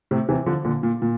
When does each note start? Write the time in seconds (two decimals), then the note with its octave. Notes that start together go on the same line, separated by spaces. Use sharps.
0.11 A2 C3
0.29 C3 E3
0.46 D3 F3
0.65 A#2 D3
0.83 A#2
1.02 A#2